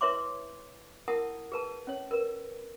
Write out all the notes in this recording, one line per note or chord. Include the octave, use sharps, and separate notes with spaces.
E4 B4 C#5 E5 C6 D6
E4 A#4 F#5 A5 D#6
G#4 B4 A5
C#4 C#5
A#4 B4